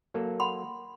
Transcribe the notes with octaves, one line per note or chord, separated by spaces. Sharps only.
F#3 A#3 A4
F#5 B5 C6